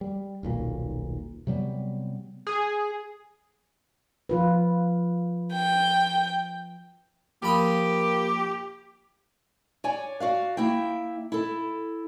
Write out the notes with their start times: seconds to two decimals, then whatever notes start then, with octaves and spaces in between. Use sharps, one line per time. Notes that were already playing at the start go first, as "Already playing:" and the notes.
0.01 G3
0.43 D#1 B1 A#2
1.47 C3 F#3 G3 B3
2.47 G#4
4.29 F3 F4 B4
5.53 G5
7.42 F3 A#3 G4 B5 D#6
9.84 C#5 D5 G#5
10.20 F#4 D5 F5
10.57 A#3 E4 E5 G5
11.32 E4 A4